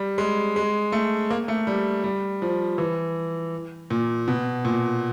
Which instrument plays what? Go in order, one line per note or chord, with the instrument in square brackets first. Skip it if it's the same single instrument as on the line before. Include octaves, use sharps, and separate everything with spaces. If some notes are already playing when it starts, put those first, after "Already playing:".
Already playing: [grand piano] G3
G#3
G#3
A3
A#3
A3
G3
G3
F3
E3
A#2
B2
A#2